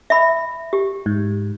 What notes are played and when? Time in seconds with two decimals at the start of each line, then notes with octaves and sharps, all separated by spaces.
0.10 E5 B5
0.73 G4
1.06 G#2